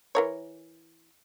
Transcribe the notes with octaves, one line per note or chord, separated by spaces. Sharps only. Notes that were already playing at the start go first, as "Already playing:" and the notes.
E3 A#4 C#5